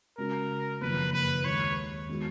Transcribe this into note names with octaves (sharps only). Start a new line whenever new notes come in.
C#3 G#3 C#4 F#4 A#4
F#1 F2 D#3 A#3 B4
B4
D#2 D#3 G#3 C#5
D#3 G#3 B3 F#4